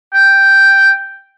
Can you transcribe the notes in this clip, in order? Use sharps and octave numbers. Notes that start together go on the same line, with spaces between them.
G5